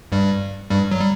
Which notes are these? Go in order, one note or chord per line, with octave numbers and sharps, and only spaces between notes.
G2 G3
G2 G3
F#3
G3